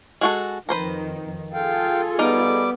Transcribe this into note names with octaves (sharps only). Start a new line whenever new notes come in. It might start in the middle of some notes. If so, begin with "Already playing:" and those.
G#3 F#4 A4
F2 D#3 B4 C5 A#5
F4 G#4 A4 F5 G5
G3 B3 D#4 A#4 D6